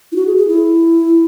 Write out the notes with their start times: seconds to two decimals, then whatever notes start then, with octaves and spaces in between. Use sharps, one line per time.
0.12 E4
0.16 F#4
0.27 G#4
0.37 G#4
0.48 E4